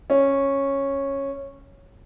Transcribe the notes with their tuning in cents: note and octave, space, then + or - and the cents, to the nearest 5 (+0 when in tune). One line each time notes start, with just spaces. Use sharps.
C#4 -10